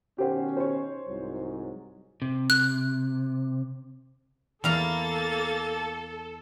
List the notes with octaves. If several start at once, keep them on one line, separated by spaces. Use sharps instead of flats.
B2 D#3 C#4 G4 C5 F#5
C5 C#5
C2 G#2 F#3
C3
F#6
E2 A#3 A4 F5 A#5 A6